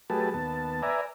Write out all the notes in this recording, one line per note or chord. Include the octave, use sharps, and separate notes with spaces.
F#3 A3 G4 G#4 B4 A5
D#2 B3 A5
B4 D5 E5 G#5 A#5